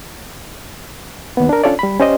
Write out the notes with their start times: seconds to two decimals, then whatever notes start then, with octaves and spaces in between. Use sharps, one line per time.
1.37 D#2 B3
1.49 D4 A#4
1.64 C#4 D4 F4 A4 C#5 D5
1.79 G3 B5
1.99 C#4 G4 C5 D5 D#5